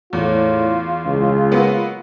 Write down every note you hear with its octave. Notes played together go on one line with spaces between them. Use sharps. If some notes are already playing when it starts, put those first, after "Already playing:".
E2 A2 F4
C#2
F#3 A#3 B3